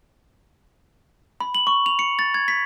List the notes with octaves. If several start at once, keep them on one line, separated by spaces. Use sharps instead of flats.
B5
F#7
C#6
F7
C#7
A6
G#6
B6